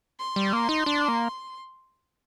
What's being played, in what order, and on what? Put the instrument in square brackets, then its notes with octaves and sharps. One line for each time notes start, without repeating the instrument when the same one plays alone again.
[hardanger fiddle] C6
[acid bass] G3
A#3
D#4
D4
A#3